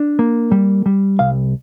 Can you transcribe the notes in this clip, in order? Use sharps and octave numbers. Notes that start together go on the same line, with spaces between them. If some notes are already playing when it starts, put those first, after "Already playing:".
Already playing: D4
A#3
G3
G3
C2 F5